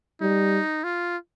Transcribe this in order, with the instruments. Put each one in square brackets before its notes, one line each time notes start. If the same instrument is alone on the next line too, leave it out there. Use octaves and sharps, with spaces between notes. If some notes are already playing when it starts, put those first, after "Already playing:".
[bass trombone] G3 [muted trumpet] D#4
[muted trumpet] F4